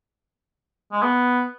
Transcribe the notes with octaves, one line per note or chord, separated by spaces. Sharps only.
G#3
B3